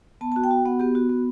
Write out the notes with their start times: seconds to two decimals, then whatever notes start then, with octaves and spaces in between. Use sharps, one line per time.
0.21 B3 A5
0.32 A5
0.36 F#4
0.44 G5
0.51 F#4
0.65 B3 F#5
0.79 B3 G4
0.95 F#4
1.09 B3